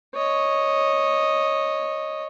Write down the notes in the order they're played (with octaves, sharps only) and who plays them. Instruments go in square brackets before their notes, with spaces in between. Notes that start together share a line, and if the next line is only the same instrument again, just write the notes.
[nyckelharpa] C#5 D#5